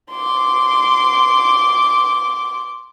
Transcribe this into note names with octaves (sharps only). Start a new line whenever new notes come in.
C6 D6